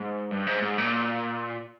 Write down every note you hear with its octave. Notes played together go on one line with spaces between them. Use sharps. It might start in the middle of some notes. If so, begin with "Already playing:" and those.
Already playing: G#2
G2
G#2
G#2
A#2